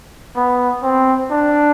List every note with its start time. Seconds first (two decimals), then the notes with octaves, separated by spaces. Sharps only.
0.35 B3
0.82 C4
1.30 D4